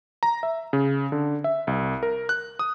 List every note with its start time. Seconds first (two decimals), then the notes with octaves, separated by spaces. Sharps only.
0.23 A#5
0.43 E5
0.73 C#3
1.12 D3
1.44 E5
1.67 C2
2.03 A#4
2.29 F#6
2.59 D#6